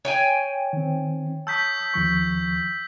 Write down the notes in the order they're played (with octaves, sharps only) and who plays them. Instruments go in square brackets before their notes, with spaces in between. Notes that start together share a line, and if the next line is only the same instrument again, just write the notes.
[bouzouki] C#5 G5 G#5
[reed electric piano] D#3 C4
[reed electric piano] A5 C#6 D#6 [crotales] E6 G6 B6
[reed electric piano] D#2 F3 C#6